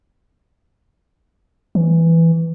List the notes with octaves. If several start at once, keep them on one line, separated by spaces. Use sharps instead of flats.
E3